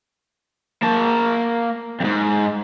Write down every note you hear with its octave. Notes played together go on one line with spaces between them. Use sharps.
A#3 A5
F2 G#2